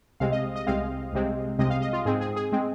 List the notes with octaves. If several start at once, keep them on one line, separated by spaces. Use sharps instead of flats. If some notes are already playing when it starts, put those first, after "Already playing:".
C2 C3 G#3 C4 F5
D#5
D#5
C2 C3 G#3 C4 F5
C2 C3 G#3 C4
C2 C3 G#3 C4 D#5
F5
D#5
F4
G#2 G#3 C4 G#4
G#4
G#4
G#3 C4